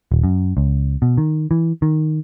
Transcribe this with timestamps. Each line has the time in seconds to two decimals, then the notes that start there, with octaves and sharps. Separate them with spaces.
0.12 D#1
0.24 F#2
0.57 C#2
1.02 B2
1.18 D#3
1.51 E3
1.82 D#3